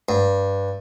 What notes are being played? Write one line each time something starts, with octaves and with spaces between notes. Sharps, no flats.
G2